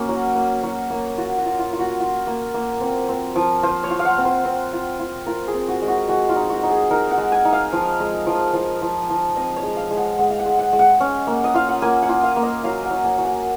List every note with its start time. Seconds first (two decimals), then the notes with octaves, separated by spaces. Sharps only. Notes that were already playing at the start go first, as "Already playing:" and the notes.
Already playing: A#3 C#4 F#4
0.09 F#3
0.35 A#3
0.63 F#3
0.90 A#3
1.18 F4 F#4
1.38 F#4
1.45 F4
1.59 F4
1.73 F4
1.79 F#4
2.00 F4
2.27 A#3
2.54 A#3
2.81 C4
3.09 C4
3.36 F3
3.63 F4 C5
3.84 C#5
3.91 F4
3.99 F5
4.05 F#5
4.18 C4
4.25 C5
4.45 C4
4.73 F4
5.00 F4
5.26 F4 A#4
5.48 G#4
5.54 C4
5.68 F#4
5.82 G#3
5.88 F#4
6.08 G#3 F#4
6.29 F4
6.36 D#4
6.50 F#4
6.63 D#4
6.70 G#4
6.90 D#4 A#4
7.11 F#5
7.18 G#3
7.32 G#5
7.45 D#4
7.52 F5
7.73 F3
8.00 G#3
8.27 F3
8.54 F3
8.82 F3
9.10 F3
9.36 C4 D#5
9.56 C#5
9.63 G#3
9.77 F5
9.91 G#3
9.97 F#5
10.19 G#3 F#5
10.30 F5
10.39 F#5
10.46 G#3
10.59 F#5
10.73 G#3
10.79 F#5
11.00 C#4
11.27 A#3
11.44 D#5
11.54 F4 F5
11.69 F#5
11.82 A#3 G#5
12.03 F#5
12.09 F4
12.23 F5
12.36 A#3
12.43 D#5
12.64 F#3 F5
12.84 F#5
12.90 F#3
13.05 G#5
13.18 F#3
13.25 F#5